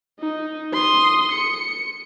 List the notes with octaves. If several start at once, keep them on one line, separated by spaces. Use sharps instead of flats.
D#4
C6 D#6
C#7